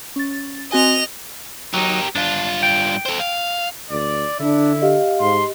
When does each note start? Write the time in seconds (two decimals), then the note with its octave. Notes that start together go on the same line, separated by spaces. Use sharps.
0.16 C#4 A6
0.72 C4 F#4 D#5 G#5 F7
1.74 F#3 D#4 G4 A#4
2.15 G2 D4 F4
2.63 G5
3.06 A4 C5
3.20 F5
3.91 D2 D5
4.40 D3 D4 E4
4.82 G4 D#5 F5
5.20 G#2 C6